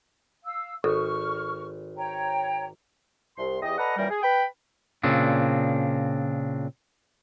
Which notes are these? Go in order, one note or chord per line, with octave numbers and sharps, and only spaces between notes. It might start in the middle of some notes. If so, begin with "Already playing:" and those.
F5 E6
G#1 A4 C#6 F6
C#5 G5 A#5
C2 C6
E2 G4 D#5
A4 B4 D5 D#5 F#5 A#5
F#2 A#2 E3 G3 A#4 G5
G#4
B4 G5 B5
A#2 C#3 C4 D4